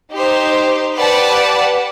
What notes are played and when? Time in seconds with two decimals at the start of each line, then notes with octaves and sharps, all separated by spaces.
0.12 D#4 G4 C5
0.95 G4 B4 D5 F#5 A5